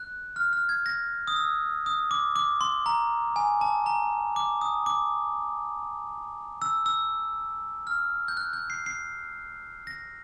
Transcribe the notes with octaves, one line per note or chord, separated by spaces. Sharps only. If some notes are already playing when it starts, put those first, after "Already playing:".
Already playing: F#6
F6
F6
G#6
A#6
D#6
E6
D#6
D6
D6
C6
A#5
G#5
A5
A#5
D6
D#6
D6
E6
E6
F6
G6
F#6
G6
C7
C7
A#6